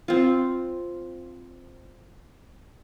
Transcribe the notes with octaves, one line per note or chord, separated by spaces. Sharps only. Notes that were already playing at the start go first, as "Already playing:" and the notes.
C4 F4